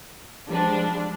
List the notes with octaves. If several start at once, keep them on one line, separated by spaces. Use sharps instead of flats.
F3 G3 G#3 D4